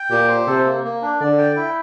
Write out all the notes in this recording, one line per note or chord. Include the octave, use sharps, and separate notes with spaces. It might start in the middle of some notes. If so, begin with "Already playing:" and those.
Already playing: G5
A#2 G4
C5
C3 A4
A#3
A#3
D4
D3 D5
G5
E4